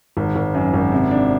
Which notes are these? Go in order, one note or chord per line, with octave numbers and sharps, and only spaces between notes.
G#1
G#1
F#2
G#1
C3
D4